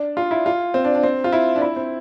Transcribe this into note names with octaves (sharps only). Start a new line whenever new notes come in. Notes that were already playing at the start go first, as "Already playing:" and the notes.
Already playing: D4
F4
E4
F4
C4
D4
D4
C4
F4
E4
D4
E4
C4